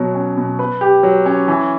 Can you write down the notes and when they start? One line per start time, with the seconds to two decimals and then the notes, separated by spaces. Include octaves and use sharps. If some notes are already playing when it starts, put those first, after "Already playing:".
Already playing: B2 F#3
0.15 C#4
0.37 B2
0.59 B4
0.81 G4
1.03 F#3
1.26 C#4
1.48 E3